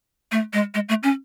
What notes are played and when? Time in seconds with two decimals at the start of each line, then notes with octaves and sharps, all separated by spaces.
0.32 A3
0.53 G#3
0.74 G#3
0.89 A3
1.03 C#4